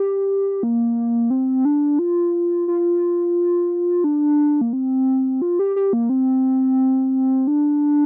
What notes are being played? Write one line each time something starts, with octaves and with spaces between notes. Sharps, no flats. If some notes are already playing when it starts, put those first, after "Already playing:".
Already playing: G4
A#3
C4
D4
F4
F4
D4
A#3
C4
F4
G4
G4
A#3
C4
D4